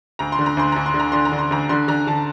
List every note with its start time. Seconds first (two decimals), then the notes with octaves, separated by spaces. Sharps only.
0.19 D2 A#5
0.32 C6
0.39 D3
0.46 A#5
0.57 D2 C6
0.72 D2 A#5
0.86 C6
0.94 D3
1.00 A#5
1.12 D3 C6
1.25 A#5
1.32 D3
1.39 C6
1.51 D2 A#5
1.69 D3 C6
1.88 D3 A#5
2.07 D3 A5